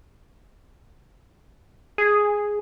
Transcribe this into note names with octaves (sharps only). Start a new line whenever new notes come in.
G#4